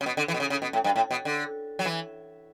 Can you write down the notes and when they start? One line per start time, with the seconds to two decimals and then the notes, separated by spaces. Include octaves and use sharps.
0.01 C#3
0.06 B2
0.17 D3
0.28 E3
0.34 B2
0.40 C#3
0.50 C#3
0.62 B2
0.73 A2
0.84 G2
0.96 A2
1.11 B2
1.25 D3
1.79 F#3
1.85 E3